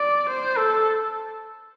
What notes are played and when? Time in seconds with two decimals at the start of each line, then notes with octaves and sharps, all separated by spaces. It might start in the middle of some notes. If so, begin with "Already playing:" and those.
Already playing: D5
0.29 C5
0.58 A4